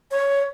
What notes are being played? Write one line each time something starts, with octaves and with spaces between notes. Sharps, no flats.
C#5